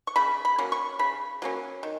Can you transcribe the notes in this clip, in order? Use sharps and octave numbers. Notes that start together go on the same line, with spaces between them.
C#6
C#3 B5
B5
F#3 A#3 C#4
C#6
C#3 B5
F#3 A#3 C#4
D#3